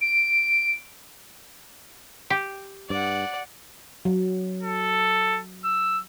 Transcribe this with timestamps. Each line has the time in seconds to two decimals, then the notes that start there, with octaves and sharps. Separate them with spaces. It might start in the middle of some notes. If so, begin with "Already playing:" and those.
0.01 D7
2.30 G4
2.90 G2 D5 F#5
4.05 F#3
4.63 A4
5.64 E6